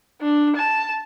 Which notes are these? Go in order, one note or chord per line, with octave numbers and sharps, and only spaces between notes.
D4
A5